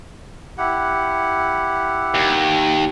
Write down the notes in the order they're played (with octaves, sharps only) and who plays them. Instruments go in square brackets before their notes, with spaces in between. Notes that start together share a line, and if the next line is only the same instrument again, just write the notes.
[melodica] E4 G4 F#5
[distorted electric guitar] D#2